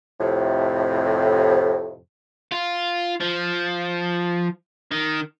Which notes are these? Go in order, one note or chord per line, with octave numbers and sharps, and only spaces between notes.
F2 A2 C3
F4
F3
D#3